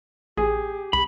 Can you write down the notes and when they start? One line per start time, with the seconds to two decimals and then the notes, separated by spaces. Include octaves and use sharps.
0.37 A1 G4 G#4
0.93 C2 B5